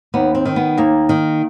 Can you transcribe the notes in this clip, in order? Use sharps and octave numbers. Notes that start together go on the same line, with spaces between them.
D#2 B3
C4
D#3
B3
D#2 A#3
D#3